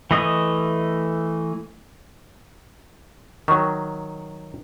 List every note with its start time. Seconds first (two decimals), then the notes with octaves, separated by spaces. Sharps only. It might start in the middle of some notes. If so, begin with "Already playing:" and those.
0.11 E3 A3 D#5 D#6
3.48 D#3 F#3 C#6